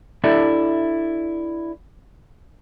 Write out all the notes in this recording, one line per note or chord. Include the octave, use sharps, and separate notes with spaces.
D4 E4 G4 A4 D5 E5